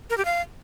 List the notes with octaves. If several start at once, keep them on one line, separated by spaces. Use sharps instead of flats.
A#4
G4
F5